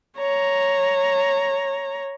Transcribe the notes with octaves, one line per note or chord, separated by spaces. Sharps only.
C#5 A#5